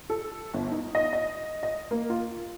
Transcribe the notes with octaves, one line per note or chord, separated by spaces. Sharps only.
A4
G1
D#4
D#5
D#5
D#5
A#3
F4